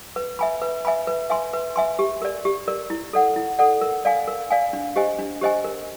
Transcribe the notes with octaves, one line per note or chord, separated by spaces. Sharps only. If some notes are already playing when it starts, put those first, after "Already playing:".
B4
E5 G#5 B5
B4
E5 G#5 B5
B4
E5 G#5 C6
B4
E5 G#5 C6
G4
A#4 D5
G4
A#4 D5
E4
A4 D5 F#5
E4
A4 D5 F#5
A#4
D5 F5 G#5
A#4
D5 F5 G#5
D4
G4 C5 D#5 G#5
D4
G4 C5 D#5 G#5
A#4